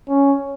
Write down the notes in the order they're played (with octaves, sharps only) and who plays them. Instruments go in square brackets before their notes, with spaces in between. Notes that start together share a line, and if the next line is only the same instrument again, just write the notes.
[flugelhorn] C#4